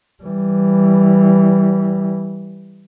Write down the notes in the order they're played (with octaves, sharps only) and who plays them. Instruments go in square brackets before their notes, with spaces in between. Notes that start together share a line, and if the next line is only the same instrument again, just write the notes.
[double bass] E3 G3